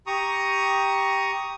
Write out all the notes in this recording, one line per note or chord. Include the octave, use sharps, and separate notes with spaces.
G4 A#5 C#6 D#6